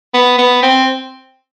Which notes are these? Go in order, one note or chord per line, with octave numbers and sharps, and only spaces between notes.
B3
B3
C4